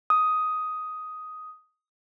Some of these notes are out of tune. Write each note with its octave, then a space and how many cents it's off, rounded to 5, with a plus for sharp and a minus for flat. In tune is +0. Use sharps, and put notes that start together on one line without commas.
D#6 +10